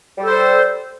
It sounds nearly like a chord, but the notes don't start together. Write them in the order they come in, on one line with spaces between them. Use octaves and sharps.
G3 A4 C5